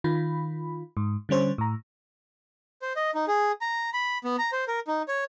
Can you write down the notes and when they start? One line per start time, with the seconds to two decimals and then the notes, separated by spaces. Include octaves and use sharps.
0.04 D#3 F4 B5
0.97 G#2
1.29 D3 G3 C#4 C5 C#5
1.58 A2 A#5
2.82 C5
2.96 D#5
3.15 D#4
3.28 G#4
3.61 A#5
3.93 B5
4.24 B3
4.39 A#5
4.52 C5
4.68 A#4
4.87 D#4
5.08 C#5